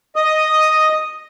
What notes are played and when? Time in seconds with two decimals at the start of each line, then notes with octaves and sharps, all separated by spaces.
0.16 D#5 D#6